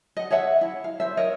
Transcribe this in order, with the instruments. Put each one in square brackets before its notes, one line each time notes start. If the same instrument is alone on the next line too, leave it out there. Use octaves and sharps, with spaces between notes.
[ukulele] D#5 F#5
G#4 C#5 E5 F#5
E4
F5
C5 E5
A#4 C#5 D#5